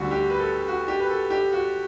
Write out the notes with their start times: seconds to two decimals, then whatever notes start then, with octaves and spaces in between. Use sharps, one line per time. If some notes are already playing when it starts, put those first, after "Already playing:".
Already playing: D2 D3 G3 F#4
0.11 G4
0.30 B4
0.39 A4
0.68 F#4
0.88 G4
1.00 B4
1.10 A4
1.30 G4
1.53 F#4